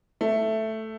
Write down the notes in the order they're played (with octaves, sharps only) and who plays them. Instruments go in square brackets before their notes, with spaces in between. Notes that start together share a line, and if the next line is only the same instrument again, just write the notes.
[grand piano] A3